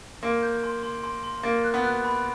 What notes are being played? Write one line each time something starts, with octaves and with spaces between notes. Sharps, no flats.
A#3 C6
G6
C6
C6
C6
C6
A#3 A6
F#6
B3
F#6
B5